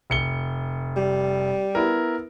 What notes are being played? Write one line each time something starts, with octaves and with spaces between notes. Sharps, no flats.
F1 C#7 G7
G3
B3 E4 A#4